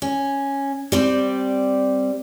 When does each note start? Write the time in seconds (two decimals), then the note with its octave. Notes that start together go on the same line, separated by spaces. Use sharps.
0.02 C#4
0.92 G3 C4 D5